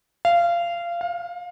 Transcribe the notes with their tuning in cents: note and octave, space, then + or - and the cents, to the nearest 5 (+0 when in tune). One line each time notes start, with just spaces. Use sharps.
F5 -20
F5 +25